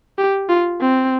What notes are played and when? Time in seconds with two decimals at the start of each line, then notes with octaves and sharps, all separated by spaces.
0.18 G4
0.49 F4
0.81 C4